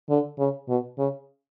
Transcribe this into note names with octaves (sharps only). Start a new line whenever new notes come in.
D3
C#3
B2
C#3